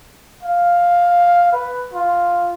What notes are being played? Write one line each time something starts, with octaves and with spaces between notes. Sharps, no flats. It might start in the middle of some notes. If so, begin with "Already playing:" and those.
F5
B4
F4